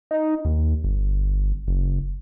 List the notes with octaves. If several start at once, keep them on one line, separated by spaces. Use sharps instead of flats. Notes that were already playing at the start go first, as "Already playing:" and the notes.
D#4
D#2
G1
F#1